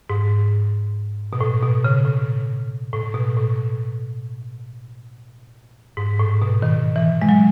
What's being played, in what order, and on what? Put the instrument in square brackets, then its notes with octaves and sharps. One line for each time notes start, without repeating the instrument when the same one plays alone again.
[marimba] G#2
B2
A2
B2
C#3
A2
A2
B2
A2
G#2
A2
B2
D#3
E3
G#3
F#3